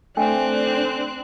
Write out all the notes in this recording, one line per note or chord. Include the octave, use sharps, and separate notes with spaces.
A3 C4 D4 G5 G#5 F#6